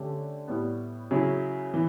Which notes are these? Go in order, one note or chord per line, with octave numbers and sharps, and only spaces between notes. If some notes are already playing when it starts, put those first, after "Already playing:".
Already playing: D3 A3 C#4 G4
A2 G3 B3
C#3 F#3 C#4 E4
E3